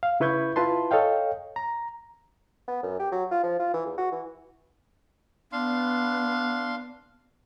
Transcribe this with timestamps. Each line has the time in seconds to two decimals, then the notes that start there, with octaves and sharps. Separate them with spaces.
0.03 F5
0.20 C#3 E4 B4 C#6 G6 G#6
0.56 E4 F4 B4 A5 C6
0.91 A4 C#5 D#5 F5 G5
1.56 A#5
2.68 B3
2.83 F#2
3.00 G4
3.12 F#3
3.31 F4
3.43 F3
3.59 F4
3.74 E3
3.86 E2
3.98 F#4
4.12 E3
5.52 B3 D4 F5 C6